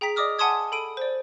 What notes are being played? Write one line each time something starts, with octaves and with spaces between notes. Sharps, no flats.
G#4 G5 A#5 B6
D5 D#5 D6 D#6 F6
F#5 G#5 A5 C6 D#6 G#6
A4 B5 D7 D#7
C5 D5